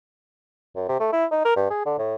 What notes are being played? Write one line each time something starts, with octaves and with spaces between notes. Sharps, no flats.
F#2
C3
A3
E4
D#4
A#4
G2
G#4
D3
A2